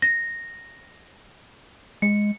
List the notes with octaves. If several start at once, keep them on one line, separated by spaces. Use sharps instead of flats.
A#6
G#3 C#7